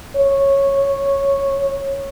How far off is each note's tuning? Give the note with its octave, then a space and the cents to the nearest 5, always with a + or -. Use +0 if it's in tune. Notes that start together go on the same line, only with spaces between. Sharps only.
C#5 -10